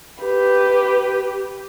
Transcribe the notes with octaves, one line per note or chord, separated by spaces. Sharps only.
G4 B4